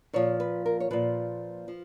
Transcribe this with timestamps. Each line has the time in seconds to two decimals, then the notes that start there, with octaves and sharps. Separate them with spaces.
0.13 A#2 F3 C#5
0.40 B4
0.66 A#4
0.80 C#5
0.91 A#2 F3 B4
1.68 F3